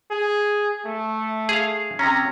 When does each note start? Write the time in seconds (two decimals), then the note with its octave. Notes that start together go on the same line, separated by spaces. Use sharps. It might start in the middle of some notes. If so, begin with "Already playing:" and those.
0.11 G#4
0.85 A3
1.49 G#4 F5
1.99 C3 C#4 A#5